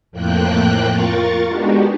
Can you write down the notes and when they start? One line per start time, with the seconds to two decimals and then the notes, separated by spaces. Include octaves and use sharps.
0.11 F2 A2 F3 A#3 G5 F#6
0.90 F4 A#4 C#6 A6
1.48 G#3 B3 D4 D#4 F#4 G4